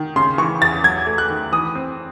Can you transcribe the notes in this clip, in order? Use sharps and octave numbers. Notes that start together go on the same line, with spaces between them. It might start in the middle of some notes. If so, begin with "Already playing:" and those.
Already playing: D#3
C#3 C6
E3 C#6
E2 A6
F#3 G#6
A3
F#6
D#3
E3 D#6
C4